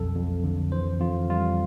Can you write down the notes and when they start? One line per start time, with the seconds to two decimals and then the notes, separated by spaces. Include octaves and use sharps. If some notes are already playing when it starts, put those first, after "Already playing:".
Already playing: B1 F2 A4
0.15 F2
0.44 D3
0.72 E3 C5
1.00 F2 F4
1.30 G3 F4